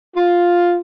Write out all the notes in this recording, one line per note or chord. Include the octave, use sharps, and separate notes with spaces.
F4